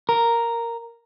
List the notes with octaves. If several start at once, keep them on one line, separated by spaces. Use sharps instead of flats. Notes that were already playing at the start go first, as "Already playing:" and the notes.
A#4